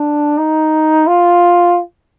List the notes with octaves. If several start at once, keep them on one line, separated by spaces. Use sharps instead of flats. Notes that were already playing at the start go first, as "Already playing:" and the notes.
Already playing: D4
D#4
F4